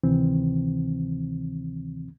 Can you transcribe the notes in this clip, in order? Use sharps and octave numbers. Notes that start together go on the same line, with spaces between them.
D2 C3 D#3 E3 C4